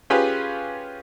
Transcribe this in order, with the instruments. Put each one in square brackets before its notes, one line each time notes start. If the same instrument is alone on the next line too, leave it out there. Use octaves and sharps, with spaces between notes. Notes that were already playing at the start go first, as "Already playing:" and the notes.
[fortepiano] C#4 F4 G4 G#4 B4